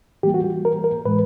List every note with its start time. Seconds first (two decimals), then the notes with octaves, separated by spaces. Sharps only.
0.23 E3 G3 A#3 G4
0.34 F#4
0.44 F#4
0.65 A#4
0.84 A#4
1.05 A2 E3 G#3 B4